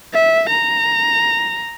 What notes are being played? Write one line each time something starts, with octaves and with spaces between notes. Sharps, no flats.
E5
A#5